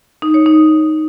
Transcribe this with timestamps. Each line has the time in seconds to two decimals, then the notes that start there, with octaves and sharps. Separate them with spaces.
0.22 D#4
0.34 C#5
0.46 D#4